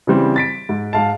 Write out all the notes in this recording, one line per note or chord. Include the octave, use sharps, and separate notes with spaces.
C#3 E3 G3 C4
A6 B6 D7
G#2
G#2 F5 A5